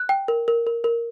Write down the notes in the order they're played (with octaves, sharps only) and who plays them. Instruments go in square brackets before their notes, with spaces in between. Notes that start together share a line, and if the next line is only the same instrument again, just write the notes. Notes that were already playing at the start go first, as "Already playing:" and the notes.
Already playing: [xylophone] F#6
G5
A#4
A#4
A#4
A#4